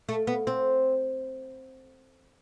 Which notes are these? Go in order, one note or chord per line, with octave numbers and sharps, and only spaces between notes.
A3
B3
C4